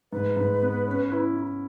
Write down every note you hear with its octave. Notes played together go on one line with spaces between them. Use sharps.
G#2 B4
G#2
B3
C#4
E4
E4